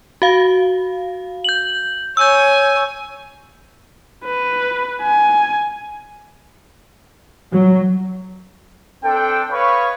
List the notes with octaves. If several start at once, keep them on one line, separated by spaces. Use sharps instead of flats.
F#4 F5
G6 F#7
C#5 G#5 E6 G6
B4
G#5
F#3
C4 D4 A4 G5
B4 C#5 D#5 F5 B5 C#6